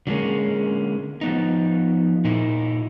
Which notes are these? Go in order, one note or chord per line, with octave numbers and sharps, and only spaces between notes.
D3 F#3 G#3 A#3 C#4
F3 B3 D#4
A#2 D#4 E4